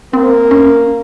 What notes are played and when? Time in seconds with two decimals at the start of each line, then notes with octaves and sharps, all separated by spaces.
0.13 A#3 C4
0.51 C#4